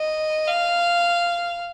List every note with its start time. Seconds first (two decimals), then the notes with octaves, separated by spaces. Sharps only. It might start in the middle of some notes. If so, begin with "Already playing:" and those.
Already playing: D#5
0.48 F5